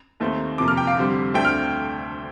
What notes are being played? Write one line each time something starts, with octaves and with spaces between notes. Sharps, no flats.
D#2 D#3 A3 C4
F2 C3 F3 A#3 D6
F6
G5
F5
F2 D3 G3 C4
D2 D3 A3 C4 G5
F6